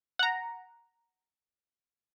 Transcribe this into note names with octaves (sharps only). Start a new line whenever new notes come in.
F#5 A#5